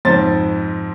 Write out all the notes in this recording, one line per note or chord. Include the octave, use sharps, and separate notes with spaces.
F2 G#2 C5 A6